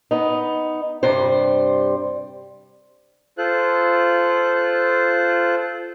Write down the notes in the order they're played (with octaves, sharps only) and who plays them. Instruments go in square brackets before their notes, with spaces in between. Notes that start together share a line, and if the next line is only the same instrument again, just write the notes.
[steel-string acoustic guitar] B3 D#4
G2 C3 G3 C5
[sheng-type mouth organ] F4 A4 C5 F#6